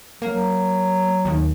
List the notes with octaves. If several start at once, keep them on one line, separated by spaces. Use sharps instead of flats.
F#3 A#3
D#2